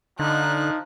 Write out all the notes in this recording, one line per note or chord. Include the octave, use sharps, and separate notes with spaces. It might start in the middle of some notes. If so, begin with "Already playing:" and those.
D3 F3 D#4 F#6